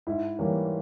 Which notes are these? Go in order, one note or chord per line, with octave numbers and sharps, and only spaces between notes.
G#2 E4
E3 G3 A#3 C#4